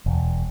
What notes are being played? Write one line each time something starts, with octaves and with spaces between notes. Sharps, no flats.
E1